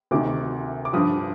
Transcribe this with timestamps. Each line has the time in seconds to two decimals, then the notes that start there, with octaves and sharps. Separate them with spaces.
0.11 D2 C3 D#3 D6
0.85 D6
0.93 G2 D3 F3 D#6